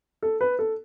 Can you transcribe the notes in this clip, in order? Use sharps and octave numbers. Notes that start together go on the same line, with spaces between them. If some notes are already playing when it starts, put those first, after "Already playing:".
A4
B4
A4